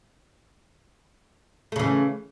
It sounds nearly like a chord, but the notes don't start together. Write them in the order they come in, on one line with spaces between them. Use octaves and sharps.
A3 C#3 E3